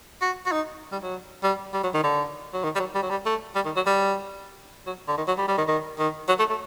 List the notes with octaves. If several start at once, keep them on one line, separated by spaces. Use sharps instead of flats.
F#4
F#4
D#4
G3
F#3
G3
G3
F#3
D#3
D3
F#3
D#3
G3
F#3
G3
F#3
G3
A3
G3
D#3
F#3
G3
F#3
D3
D#3
F#3
G3
G3
D#3
D#3
D#3
F#3
A3
A3